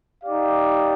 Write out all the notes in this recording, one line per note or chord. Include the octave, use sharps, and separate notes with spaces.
D#4 G4 D5 F5